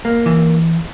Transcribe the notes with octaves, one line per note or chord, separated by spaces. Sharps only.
A#3
E3